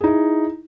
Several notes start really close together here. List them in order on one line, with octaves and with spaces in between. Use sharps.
G#4 D#4 E4